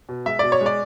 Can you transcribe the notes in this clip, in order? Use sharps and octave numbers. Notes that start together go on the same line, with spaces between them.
B2
G#3 E5
B2 D5
C#5
G#3 D5